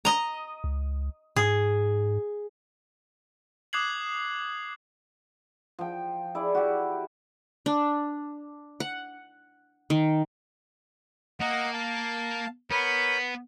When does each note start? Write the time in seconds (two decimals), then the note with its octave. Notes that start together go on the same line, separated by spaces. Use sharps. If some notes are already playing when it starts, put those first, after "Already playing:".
0.05 D#5 A#5
0.64 C#2
1.36 G#2 G#4
3.73 D6 D#6 F#6 G#6 C7 F#7
5.79 F3 G5
6.35 E4 G#4 D5
6.55 F#4 G4
7.66 D4
8.80 F#5
9.90 D#3
11.40 A#3 A#4 D#5 F#5
11.73 F5 A5
12.71 B3 A#4 C#5 B5 G6